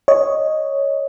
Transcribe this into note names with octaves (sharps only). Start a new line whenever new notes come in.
C#5 D#5